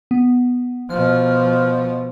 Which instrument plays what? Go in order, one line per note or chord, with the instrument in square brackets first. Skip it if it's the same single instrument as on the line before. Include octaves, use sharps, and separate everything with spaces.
[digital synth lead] B3
[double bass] B2 F3 [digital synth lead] F6